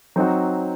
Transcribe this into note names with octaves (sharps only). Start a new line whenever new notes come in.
F#3 C4 D#4 F#4